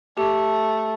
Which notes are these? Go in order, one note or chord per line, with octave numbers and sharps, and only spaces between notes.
A3 G4